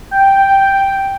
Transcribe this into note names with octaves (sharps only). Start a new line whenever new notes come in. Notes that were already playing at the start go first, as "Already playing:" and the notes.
G5